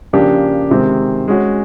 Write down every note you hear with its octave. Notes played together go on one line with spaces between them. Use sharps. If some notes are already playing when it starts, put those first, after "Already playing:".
C#3 F3 A#3 D4 G4
C3 D#3 G#3 C4
G#3 C#4 F#4